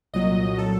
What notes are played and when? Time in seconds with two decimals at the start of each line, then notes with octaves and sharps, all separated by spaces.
0.14 C2 A#2 F#3 D#5
0.58 A4